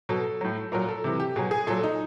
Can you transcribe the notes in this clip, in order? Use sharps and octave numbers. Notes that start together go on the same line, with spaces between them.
B2 F#3 A4
A2 F#3
A#2 F#3 A#4
A4
C3 E3
G4
B2 F#3 G#4
G#4
A#2 F#3 A4
D#4